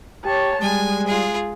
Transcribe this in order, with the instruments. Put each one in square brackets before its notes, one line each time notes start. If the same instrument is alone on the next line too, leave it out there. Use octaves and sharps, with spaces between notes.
[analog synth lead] G4 [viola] C#5 A5
[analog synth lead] G3 [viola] G#3 [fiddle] G#5
[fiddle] F4 G#4